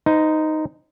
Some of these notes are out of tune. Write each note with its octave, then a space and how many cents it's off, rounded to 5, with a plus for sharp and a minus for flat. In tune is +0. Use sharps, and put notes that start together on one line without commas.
D#4 +0 C5 -35